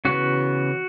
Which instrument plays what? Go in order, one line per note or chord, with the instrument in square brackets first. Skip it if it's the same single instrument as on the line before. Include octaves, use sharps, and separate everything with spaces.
[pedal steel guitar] C#3 E3 B3 F#4